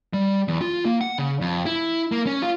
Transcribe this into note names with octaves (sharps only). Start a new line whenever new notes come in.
G3
E2
F4
A#3
F#5
C#3
F2
E4
A#3
C#4
F4